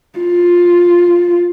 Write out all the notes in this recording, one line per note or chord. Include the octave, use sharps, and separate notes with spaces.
F4